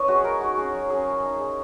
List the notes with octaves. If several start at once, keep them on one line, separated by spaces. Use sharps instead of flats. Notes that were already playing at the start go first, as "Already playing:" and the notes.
Already playing: C#4 E4 B4 C#5 D#5
G#3 F#4
G#4
G#3 A#4
D#4 F#4
C#4 G#4
F#3
C#4 G#4
E4
D#4
G#3